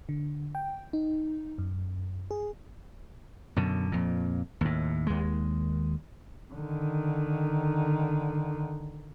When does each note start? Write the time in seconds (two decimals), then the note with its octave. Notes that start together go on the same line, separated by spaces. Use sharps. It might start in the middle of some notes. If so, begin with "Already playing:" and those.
0.09 D3
0.55 G5
0.93 D#4
1.58 F#2
2.31 G#4
3.56 F#2 B2 D3
3.92 F2 A#2
4.61 D#2 A2
5.07 D#2 G#3
6.53 D3 D#3